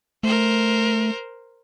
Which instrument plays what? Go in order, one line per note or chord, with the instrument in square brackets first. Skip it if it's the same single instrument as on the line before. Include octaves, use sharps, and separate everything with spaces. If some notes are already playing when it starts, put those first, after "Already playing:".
[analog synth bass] A3 [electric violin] A#4 C5